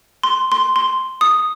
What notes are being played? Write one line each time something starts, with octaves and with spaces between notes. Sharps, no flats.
C6
C6
C6
D#6